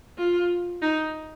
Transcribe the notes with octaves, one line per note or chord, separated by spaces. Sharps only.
F4
D#4